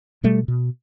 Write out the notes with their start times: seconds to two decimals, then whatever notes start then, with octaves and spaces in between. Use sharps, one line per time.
0.23 B2 G3 A3
0.48 B2